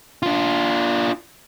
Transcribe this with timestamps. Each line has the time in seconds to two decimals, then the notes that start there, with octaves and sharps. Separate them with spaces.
0.23 D4 F4